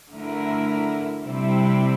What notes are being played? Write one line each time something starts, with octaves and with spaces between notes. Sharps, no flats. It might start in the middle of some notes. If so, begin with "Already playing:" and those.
D3 A3 E4 A#4
C3 G3 C4 E4